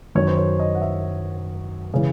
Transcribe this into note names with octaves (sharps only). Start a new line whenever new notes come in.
F#2 D#3 F#3 C#5
C5
C#5
D#5
F#5
E5
C#3 E3